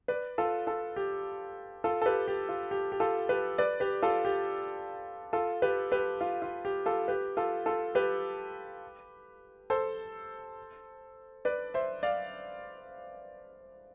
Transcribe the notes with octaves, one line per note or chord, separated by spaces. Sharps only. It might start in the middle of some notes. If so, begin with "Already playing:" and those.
B4 D5
F4 A4
F4 A4
G4
F4 A4
A4
G4 B4
G4
F4
G4
G4
F4 A4
G4 B4
B4 D5
G4 B4
F4 A4
G4
F4 A4
G4 B4
G4 B4
F4
F4
G4
F4 A4
G4 B4
F4 A4
F4 A4
G4 B4
A4 C5
B4 D5
C5 E5
D5 F5